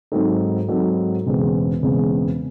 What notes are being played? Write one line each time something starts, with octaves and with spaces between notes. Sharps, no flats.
G#2 F#3 C4 D#4 A4
G#2 F#3 C4 D#4 A4
E1 E2 C#3 G#3 C4
E1 E2 C#3 G#3 C4